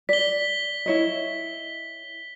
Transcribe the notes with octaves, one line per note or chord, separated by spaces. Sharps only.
D5 B6 G7
E4 C#5 D#5